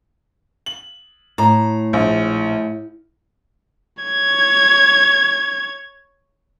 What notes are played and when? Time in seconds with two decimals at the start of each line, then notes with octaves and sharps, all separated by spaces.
0.66 F#7
1.38 A2 A#5
1.93 A#1
4.03 C#5 G#6